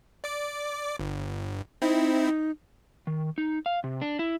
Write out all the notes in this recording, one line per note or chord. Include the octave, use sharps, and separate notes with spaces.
D5 D6
G1
C4 D#4 E4
D#3
D#4
F5
C3
D4
E4